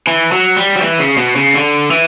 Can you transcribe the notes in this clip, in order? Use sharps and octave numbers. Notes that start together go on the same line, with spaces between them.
E3
F#3
G3
F#3
E3
C#3
B2
C#3
D3
E3